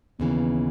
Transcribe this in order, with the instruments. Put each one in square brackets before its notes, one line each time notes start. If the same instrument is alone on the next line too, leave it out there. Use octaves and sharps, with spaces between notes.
[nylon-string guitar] D#2 C#3 E3 [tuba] B3